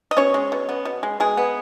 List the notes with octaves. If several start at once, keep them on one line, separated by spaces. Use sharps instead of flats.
D#5
B2 C#4 C#5
G#3
B2
B3
B2
G#3
B2 G#3 G#4
B3